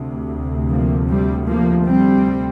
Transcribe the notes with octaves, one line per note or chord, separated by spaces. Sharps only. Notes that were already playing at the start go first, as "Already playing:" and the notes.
Already playing: D2 C3
F3 A#3
G3 C4
F3 A#3
G3 C4